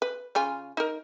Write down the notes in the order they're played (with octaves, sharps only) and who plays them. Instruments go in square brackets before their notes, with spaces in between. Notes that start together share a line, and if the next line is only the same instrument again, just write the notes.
[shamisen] B4
C#3 F4 G#5
D#4 A#4